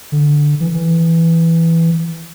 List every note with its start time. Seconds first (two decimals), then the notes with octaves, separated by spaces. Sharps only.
0.12 D3
0.60 E3
0.74 E3